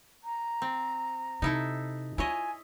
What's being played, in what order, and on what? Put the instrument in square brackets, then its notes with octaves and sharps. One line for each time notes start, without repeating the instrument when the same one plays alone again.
[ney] A#5
[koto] C4
[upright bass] C3 [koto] D#4 E4 A4
[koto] E4 C#5 D#5 [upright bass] F4 [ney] G#5